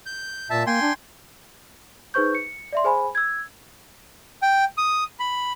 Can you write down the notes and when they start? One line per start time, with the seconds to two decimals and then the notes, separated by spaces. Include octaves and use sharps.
0.06 G6
0.50 A#2 E5 A5
0.67 A#3 G5 G#5 C6
0.81 D4
2.14 D#4 G#4 B4 C5 C#6 G6
2.35 C#7
2.73 D5 E5 C6
2.84 G#4 C5 G#5 B5
3.15 E6 G#6
4.42 G5
4.78 D#6
5.20 B5